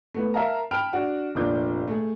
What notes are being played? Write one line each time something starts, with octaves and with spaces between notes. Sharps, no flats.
A3 B3 E4
A#4 E5 F5 A5 A#5
G5 A5 B5 F6 D7 F7
D4 F#4 F#5
F1 A#2 D4 D6 G6
A3 G#4